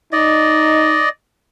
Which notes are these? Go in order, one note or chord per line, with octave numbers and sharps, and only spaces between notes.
D#4 D5 D#5